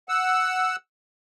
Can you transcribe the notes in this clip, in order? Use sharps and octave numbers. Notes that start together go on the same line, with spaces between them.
F#5 E6